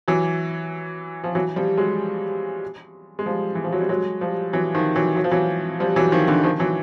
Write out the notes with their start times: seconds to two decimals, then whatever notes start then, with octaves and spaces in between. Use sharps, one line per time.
0.08 E3 F#3
1.24 F3
1.35 E3 F#3
1.56 F3 G3
1.77 F#3 G#3
3.19 G#3
3.26 F3 G3
3.55 E3
3.64 F3
3.73 F#3
3.81 G3
3.89 F#3 G#3
4.21 F3 G3
4.53 E3 F#3
4.74 D#3 F3
4.96 E3 F#3
5.16 F#3
5.24 F3
5.31 E3 F#3
5.80 F3 G3
5.96 E3 F#3
6.12 D#3 F3
6.28 D3 E3
6.44 D#3 F3
6.60 E3 F#3